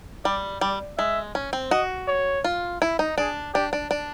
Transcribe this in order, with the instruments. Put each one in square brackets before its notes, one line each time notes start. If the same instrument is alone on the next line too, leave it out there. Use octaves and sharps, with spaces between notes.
[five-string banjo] G3 [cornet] D5
[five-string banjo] G3 [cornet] D5
[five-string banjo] G#3 [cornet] E5
[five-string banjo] C#4
C4
[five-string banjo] F#4 [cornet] D#5
[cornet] C#5
[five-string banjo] F4
E4
D#4
[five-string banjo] D4 [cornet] G#4
[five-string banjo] D4 [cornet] G4
[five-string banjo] D4
D4